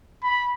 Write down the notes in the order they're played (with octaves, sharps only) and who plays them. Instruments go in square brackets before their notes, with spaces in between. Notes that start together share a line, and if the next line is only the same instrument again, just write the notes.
[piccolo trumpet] B5